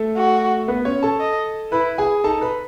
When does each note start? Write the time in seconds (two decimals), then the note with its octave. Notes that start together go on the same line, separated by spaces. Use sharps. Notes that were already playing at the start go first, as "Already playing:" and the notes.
Already playing: A3 A4
0.16 F#4
0.68 B3 B4
0.85 C#4 C#5
1.03 A4 A5
1.20 D#5
1.72 E4 B4 B5
1.98 G#4 G#5
2.24 D#4 A4 A5
2.41 B4 B5